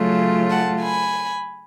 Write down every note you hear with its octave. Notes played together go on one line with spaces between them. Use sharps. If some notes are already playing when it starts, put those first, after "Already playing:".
Already playing: C#3 F#3 A3 F4
F#5 A5
G#5 B5